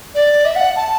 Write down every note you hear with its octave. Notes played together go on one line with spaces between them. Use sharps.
D5
E5
F#5
A5